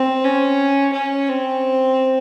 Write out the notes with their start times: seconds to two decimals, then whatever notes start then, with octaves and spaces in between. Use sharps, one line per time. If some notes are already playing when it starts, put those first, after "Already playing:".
Already playing: C4
0.24 C#4
0.93 C#4
1.28 C4